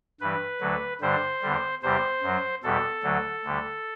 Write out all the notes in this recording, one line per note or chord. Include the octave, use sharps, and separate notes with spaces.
G2 E3 G3 B4
D2 D3 F#3
G2 D3 G3 C5
E2 D3 G3
E2 C3 G3 C5
F#2 F#3
E2 B2 G3 A4
D2 D3 F#3
D2 D3 G3